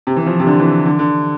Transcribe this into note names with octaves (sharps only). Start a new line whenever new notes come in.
C3
E3
F3
C3
D3
E3
D3
D3